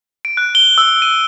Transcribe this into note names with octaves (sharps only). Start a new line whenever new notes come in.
D7
F#6
G7
E6
D#7